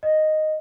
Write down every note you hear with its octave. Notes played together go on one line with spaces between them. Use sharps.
D#5